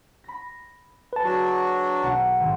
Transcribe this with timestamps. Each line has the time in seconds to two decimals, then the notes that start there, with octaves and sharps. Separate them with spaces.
0.24 B5 A#6
1.13 B4 A5
1.24 F#3 D4 F#4 G#4
2.03 B1 F#5
2.40 G#1